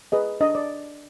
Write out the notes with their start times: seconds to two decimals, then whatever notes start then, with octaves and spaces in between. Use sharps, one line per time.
0.12 G#4 B4 D#5
0.41 D4 D#5
0.55 D5